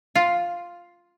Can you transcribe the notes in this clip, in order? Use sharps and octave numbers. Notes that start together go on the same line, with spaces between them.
F4